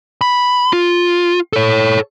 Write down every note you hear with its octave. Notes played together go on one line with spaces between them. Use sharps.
B5
F4
A4 C#5